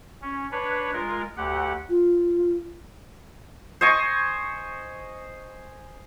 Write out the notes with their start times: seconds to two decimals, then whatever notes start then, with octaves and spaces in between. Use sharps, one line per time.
0.22 C#4
0.51 D4 B4 C#5
0.93 G#3 F4 A#4
1.37 D2 G4 F#5
1.89 F4
3.81 C5 D#5 G#5 C#6